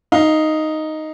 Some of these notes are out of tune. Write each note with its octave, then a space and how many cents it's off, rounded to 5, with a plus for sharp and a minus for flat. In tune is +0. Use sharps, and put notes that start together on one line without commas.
D#4 +0 F5 -10